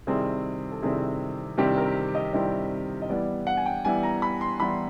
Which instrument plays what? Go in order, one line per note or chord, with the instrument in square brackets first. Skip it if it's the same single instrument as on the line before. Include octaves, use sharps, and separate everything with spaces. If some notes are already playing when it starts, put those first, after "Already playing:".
[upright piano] C3 D#3 G3 C4 E4 G#4
A4
C3 D#3 G3 C4 E4 G#4
C3 D#3 G3 C4 E4 G4
A#4
D#5
C3 D#3 G3 C4 E4 D#5
D#5
E3 G3 B3 E4 D5
F#5
G#5
G5
E3 G3 B3 E4 G#5
A#5
B5
C6
E3 G3 B3 E4 B5